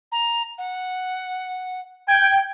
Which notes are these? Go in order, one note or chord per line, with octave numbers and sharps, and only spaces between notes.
A#5
F#5
G5 G#6